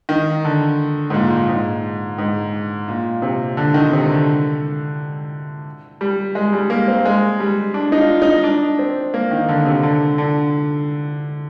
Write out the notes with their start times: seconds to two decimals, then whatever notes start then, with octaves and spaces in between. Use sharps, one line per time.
0.09 D#3
0.45 D3
1.10 G#2
1.14 A#2
1.49 G#2
2.18 G#2
2.88 A#2
3.22 C3
3.57 D3
3.74 D#3
3.92 C3
4.10 D3
6.01 G3
6.35 G#3
6.53 G3
6.70 A#3
6.88 C4
7.05 G#3
7.40 G3
7.74 D4
7.92 D#4
7.98 F4
8.22 D#4
8.44 D4
8.79 C4
9.14 A#3
9.31 D#3
9.49 D3
9.65 C3
9.83 D3
10.18 D3